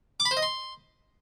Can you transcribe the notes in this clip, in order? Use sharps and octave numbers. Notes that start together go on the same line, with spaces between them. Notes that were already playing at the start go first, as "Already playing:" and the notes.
D6
B5
C5
D#5
C6